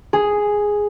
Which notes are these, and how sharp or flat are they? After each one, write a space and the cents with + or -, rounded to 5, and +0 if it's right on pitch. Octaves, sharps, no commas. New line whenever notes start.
G#4 +0